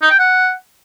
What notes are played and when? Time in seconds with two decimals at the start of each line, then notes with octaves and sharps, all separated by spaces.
0.02 D#4
0.11 G5
0.19 F#5